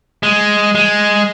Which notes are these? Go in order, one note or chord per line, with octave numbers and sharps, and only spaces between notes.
G#3
G#3